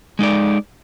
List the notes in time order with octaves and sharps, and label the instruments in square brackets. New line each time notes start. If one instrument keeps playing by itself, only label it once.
[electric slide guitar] G#3 D#4 A4 D5